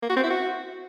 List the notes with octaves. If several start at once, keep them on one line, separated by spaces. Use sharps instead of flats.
A#3
F#4
C4
E4
F#4